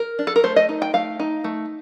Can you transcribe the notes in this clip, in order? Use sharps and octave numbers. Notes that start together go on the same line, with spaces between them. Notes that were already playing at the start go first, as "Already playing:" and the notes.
Already playing: A#4
D4
A4
A#4
A3 C5
D#5
D#4
G5
A3 F5
D#4
A3